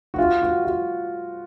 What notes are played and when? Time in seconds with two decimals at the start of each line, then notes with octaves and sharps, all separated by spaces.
0.14 F#4
0.19 F4
0.42 F#4
0.65 F4